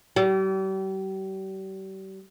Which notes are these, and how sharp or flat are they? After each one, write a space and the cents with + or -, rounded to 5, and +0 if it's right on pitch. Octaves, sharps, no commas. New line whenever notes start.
G3 -40